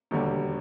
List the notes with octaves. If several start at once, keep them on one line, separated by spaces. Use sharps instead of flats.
E1 D#2 D3 G3